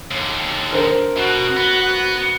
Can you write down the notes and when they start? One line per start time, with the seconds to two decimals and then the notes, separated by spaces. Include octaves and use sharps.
0.11 D#2 D3
0.72 D4 A#4 C5
1.17 B2 F#4
1.57 B3